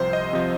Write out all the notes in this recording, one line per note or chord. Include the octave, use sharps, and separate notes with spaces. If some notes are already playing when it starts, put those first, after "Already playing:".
Already playing: C2 C3 F3 C5
D#5
C3 F3